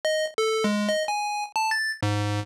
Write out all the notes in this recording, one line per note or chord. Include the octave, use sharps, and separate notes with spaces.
D#5
A4
G#3
D#5
G#5
A5
A6
G#2